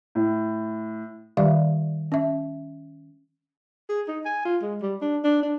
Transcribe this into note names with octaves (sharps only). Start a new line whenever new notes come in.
A2
D#3 G3 G4 D5 E5 F5
C#4 E5
G#4
D#4
G#5
F4
G#3
G3
D4
D4
D4